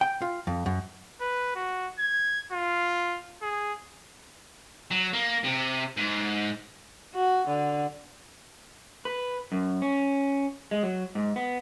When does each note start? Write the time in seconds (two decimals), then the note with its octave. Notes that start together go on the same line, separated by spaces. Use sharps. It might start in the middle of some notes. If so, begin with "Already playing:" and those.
0.01 G5
0.22 F4
0.47 F2
0.66 F#2
1.21 B4
1.55 F#4
1.99 G#6
2.52 F4
3.42 G#4
4.91 F#3
5.13 A#3
5.44 C3
5.97 G#2
7.15 F#4
7.47 D3
9.05 B4
9.52 F#2
9.82 C#4
10.71 G#3
10.83 F#3
11.15 G#2
11.36 B3